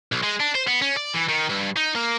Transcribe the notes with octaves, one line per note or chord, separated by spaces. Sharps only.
B1
G#3
D4
C5
B3
C#4
D5
E3
D#3
G2
D#4
A#3